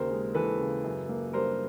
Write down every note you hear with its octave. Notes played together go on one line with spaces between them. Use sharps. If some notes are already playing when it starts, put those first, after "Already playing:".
Already playing: D#2 C#3 A#4 C5
G#3
E3 A4 B4
C#3
F#2
A#3
G3 A#4 C5